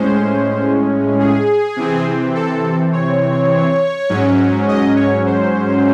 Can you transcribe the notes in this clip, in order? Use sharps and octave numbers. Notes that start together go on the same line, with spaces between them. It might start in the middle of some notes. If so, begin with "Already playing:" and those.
Already playing: A2 G#3 C#4 C5
G#4
C3 E3 C4
A4
C#5
G#2 F#3 C#4
D#5
C#5
C5